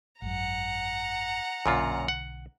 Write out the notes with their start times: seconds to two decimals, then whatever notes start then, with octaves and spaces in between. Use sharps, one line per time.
0.22 G#1 F#2 F#5 A#5
1.66 B1 F#2 A#2 D3 F4
2.08 F#5